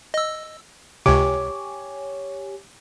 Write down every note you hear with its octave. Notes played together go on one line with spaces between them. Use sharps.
D#5 E6
C#2 C3 G4 C#5 G#5 D6